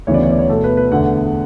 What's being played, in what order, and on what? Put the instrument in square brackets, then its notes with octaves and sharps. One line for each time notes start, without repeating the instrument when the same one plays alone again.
[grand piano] D2 C#3 E3 B3 C#5
D5
C#5
D5
C#5
B2 A3 A4
B4
B4
E2 D3 A3 F#5